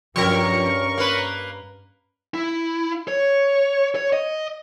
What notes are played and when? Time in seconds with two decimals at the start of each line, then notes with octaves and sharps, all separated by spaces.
0.16 G2 F3 C#4 A#4 C#6
0.98 A#3 B4
2.34 E4
3.08 C#5
3.95 C#5
4.13 D#5